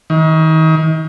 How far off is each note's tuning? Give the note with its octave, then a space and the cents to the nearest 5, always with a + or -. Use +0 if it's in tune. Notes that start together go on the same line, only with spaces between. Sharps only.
D#3 +35